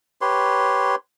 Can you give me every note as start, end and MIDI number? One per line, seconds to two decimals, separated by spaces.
0.21 0.95 67
0.21 0.95 71
0.21 0.95 73
0.21 0.95 84